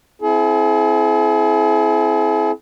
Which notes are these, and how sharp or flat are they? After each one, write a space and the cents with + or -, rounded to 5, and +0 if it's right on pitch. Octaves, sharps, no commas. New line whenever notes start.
C4 +0 E4 +0 G#4 +45